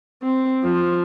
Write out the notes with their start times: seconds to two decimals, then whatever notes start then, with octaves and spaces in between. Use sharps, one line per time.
0.23 C4
0.63 F3